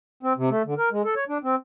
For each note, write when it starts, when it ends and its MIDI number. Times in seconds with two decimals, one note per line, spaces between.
0.23 0.33 60
0.37 0.49 48
0.49 0.62 57
0.65 0.74 50
0.78 0.89 70
0.91 1.02 56
1.05 1.14 69
1.16 1.24 73
1.29 1.38 62
1.44 1.55 60